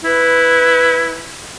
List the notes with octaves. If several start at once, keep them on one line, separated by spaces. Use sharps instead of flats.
E4 B4